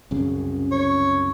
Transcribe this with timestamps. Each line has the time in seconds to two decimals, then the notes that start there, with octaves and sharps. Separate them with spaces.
0.11 C2 F#2 C#3
0.72 C#5